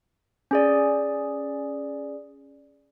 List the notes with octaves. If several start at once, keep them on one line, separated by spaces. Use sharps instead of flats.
C#4 G#4 D5